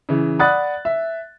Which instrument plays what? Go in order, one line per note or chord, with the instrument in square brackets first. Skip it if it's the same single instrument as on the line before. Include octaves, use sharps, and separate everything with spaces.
[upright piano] C#3 E3
D5 F#5 B5 D#6 F#6 A6
E5